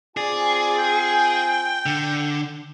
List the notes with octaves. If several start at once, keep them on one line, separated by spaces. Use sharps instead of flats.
C4 F4 G#4 D5 G#5
G5
D3